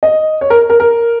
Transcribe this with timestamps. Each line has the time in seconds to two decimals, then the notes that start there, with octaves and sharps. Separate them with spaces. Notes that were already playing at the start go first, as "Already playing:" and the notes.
0.03 D#5
0.41 C#5
0.50 A#4
0.70 A#4
0.80 A#4